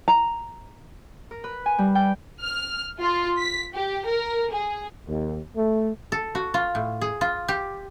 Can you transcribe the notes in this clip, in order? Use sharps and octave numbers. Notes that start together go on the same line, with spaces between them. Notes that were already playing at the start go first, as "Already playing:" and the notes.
A#5
A#4
B4
G#5
G3
G5
F6
F4
B6
G4
A#4
G#4
D#2
A3
A4
F#4
F4
A2
G#4
F4
G4